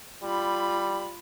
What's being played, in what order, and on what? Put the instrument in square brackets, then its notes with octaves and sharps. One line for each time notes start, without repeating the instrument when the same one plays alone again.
[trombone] G3 [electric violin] F4 B5